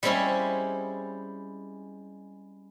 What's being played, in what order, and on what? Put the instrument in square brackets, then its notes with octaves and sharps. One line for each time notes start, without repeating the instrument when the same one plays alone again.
[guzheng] G3 G#3 C4 C#4 E4 G4